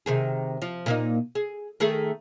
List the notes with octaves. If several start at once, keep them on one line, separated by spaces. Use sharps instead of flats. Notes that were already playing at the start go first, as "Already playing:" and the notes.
C3 D#3 G#4
F3
A#2 A#3 D#4
G#4
D#3 A3 G#4